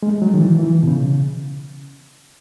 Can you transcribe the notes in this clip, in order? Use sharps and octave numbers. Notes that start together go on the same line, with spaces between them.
G#3
F#3
D#3
E3
E3
B2
C#3